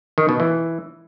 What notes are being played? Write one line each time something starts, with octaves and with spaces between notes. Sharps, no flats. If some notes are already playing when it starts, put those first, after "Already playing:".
D#3
B2
E3